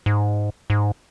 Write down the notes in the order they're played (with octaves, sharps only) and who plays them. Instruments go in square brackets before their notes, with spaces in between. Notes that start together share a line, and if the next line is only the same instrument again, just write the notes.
[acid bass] G#2
G#2